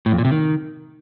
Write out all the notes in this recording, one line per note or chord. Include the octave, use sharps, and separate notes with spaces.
A2
F2
A#2
C3
D#3